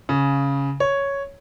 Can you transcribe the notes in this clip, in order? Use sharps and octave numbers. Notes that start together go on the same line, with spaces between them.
C#3
C#5